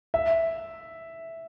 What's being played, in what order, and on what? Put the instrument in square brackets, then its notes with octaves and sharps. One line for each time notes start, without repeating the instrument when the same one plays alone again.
[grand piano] E5